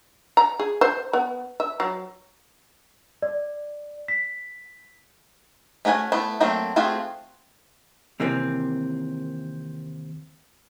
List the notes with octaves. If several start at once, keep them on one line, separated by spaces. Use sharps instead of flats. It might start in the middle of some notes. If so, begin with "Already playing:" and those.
A#5
G#4
C5
B3
E5
F#3
D5
B6
A3 C#4 F#4 B4 G#5
A3 B3 E4
F#3 A3 A#3 C4
A3 C4 F4 F#4 G#4
D#2 C3 E3 A#3 C4